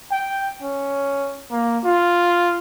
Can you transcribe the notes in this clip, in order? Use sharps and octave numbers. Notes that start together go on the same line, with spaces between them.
G5
C#4
A#3
F4